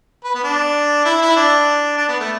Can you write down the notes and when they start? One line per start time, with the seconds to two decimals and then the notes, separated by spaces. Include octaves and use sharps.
0.24 B4
0.35 B3
0.44 D4
1.05 E4
1.22 E4
1.36 D4
1.97 D4
2.08 B3
2.20 A3